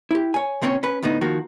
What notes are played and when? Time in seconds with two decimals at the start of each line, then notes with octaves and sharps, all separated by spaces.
0.11 E4 G4
0.34 C#5 G#5
0.62 C#2 A#2 C4 C#4 E4 C#5
0.83 C#4 B4
1.03 D2 A2 B3 D#4
1.21 D#3 F3 A#3 F#4